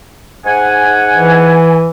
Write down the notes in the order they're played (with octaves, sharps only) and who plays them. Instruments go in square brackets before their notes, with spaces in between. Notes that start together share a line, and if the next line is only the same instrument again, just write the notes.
[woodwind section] G#2 F#5 G#5
[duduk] E3